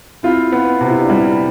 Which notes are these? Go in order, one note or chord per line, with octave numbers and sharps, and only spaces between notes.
C4 E4 F4
B3
C3 F4
E4
D4
G3 C4 E4